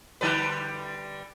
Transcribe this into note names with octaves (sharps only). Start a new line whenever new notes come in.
D3 G3 B4